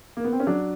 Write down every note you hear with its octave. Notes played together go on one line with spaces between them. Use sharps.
A#3
B3
C4
C#4
F#3 D4